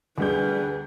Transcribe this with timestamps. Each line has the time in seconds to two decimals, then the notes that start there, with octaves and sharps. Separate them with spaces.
0.18 D2 G3 G#4 B4 G6